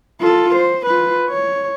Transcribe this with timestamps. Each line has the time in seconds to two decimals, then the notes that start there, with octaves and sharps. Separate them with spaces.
0.20 F4 A4
0.55 C5
0.86 F4 B4
1.29 C#5